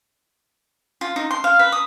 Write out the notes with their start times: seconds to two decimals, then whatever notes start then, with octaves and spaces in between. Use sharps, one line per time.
1.01 F4
1.16 D#4
1.31 C6
1.44 F5
1.59 B4
1.72 D#6